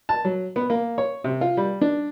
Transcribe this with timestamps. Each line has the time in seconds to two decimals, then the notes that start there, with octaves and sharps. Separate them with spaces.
0.09 A5
0.25 F#3
0.56 B3
0.70 A#3
0.98 C#5
1.24 C3
1.41 F4
1.57 G3
1.81 D4